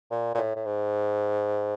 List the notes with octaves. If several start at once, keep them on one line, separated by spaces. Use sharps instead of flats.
A#2
A#2
A2
A2
G#2